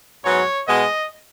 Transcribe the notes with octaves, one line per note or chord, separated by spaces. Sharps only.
G#2 F#3 B3 C#5
B2 G#3 B3 D#5